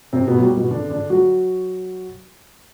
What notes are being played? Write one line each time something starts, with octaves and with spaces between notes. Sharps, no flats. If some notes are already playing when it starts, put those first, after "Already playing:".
C3 C4
B2 B3
F#3
G3
B2 B3
D3 D4
D3 D4
F#3 F#4